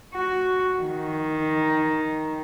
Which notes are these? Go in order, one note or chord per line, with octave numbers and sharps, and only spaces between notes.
F#4
D#3